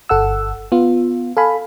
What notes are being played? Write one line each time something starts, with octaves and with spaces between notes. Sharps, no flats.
G1 A4 F#5 E6
B3 F4
A4 F5 G#5 B5